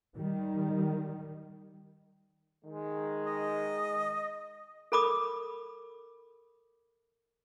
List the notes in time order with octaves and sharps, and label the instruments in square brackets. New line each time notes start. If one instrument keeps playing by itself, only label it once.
[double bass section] D#3 G3
[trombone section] D#3 G#3
[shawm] D#5
[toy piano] A4 A#4 B5 D6 D#6